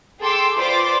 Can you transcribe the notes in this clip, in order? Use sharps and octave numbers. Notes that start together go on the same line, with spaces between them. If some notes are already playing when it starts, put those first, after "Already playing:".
G#4 A4 G5 C6 D6 E6
F4 B4 C5 D5 C6 D6